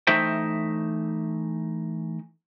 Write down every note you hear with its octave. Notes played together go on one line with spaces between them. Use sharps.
E3 A3 D#4 C5 E5 G5